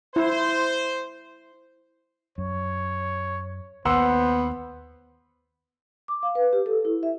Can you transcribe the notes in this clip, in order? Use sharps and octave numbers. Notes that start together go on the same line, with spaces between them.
E4 C5
F#2 C#5
D#2 B3 C5 F#5 C6 E6
D6
F5
B4
G4
A4
E4
E5